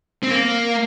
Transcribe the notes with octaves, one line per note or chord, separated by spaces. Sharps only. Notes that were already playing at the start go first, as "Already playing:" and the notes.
C4
A#3